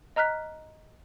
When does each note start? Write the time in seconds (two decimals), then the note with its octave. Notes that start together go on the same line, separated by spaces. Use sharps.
0.16 D#5 A#5 F6 F#6 B6